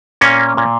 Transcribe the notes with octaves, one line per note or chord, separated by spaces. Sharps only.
A#2 A#3 C#4
A#2